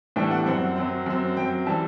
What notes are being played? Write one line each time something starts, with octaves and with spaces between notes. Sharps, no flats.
A2 E3 G3 B3 D4 G5
F#5
F#2 F#3 C4 F#5
F#2 F#3 C4
F#2 F#3 C4
F#2 F#3 C4 G5
E3 G3 A5